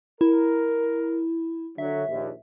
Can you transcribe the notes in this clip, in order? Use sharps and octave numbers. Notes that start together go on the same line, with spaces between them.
E4 A#4
D3 F#3 E5
A#1 D#2